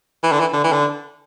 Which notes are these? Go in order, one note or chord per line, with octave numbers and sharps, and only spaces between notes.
E3
D3
E3
D3
E3
D3